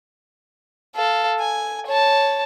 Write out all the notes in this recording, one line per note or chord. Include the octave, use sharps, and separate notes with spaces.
A4 F5
G#5
C#5 A5